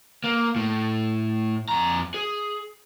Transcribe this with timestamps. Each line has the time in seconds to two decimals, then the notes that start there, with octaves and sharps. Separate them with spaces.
0.24 A#3
0.56 A2
1.69 F2 A#5
2.14 G#4